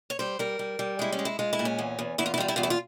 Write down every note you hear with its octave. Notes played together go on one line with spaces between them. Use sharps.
C#5
G3 C5
G3 A#4
G3
G3
G#3 E4
C#4
G#3
E4
G#3 F4
E4
A#2
C#4
E2
E2
E2 E4
F4
E4
G3 F4
E4
E2 F4
E4
F4